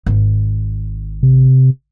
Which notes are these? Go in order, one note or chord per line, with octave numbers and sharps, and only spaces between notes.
G#1
C3